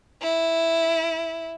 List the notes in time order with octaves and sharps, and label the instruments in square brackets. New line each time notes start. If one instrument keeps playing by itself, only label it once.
[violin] E4